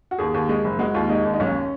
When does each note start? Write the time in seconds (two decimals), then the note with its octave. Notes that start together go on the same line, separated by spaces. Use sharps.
0.11 F#4
0.18 D#2 G#4
0.34 D#2
0.49 G#3
0.64 F#1
0.79 G#3 F#4
0.94 D#2 F4
1.09 G#3 D#4
1.25 D#2
1.34 D#4
1.40 B1 C#4